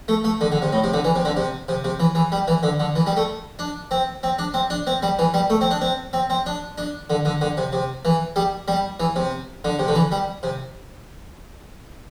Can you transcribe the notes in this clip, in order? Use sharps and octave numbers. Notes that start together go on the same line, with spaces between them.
A3
A3
D3
D3
C3
A2
C3
D3
E3
C3
D3
C3
C3
C3
E3
E3
G3
E3
D3
D3
E3
G3
A3
D4
C4
C4
D4
C4
D4
C4
G3
E3
G3
A3
C4
D4
C4
C4
C4
D4
D4
D3
D3
D3
C3
C3
E3
G3
G3
E3
C3
D3
C3
D3
E3
G3
C3